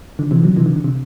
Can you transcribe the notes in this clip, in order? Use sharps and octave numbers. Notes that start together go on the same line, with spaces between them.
D3
C3 E3
D3 F#3
C3 E3
D3
D3
C3